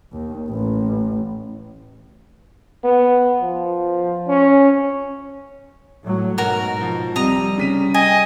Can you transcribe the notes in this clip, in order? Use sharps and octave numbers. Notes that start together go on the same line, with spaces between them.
D#2
A1
B3
F3
C#4
A2 F#3
G#2 B2 F#4 A#4
F3
C2 C3 G3 D#5 A#5
C#3 B6 D#7
D#5 G5 G#5